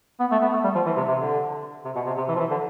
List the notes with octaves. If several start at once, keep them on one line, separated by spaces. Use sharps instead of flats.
B3
A3
B3
A3
G3
F3
E3
C3
C3
D3
C3
B2
C3
C3
E3
F3
E3
D3